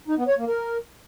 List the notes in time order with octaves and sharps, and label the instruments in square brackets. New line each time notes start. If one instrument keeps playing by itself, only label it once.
[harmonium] D#4
B3
C#5
A#3
A#4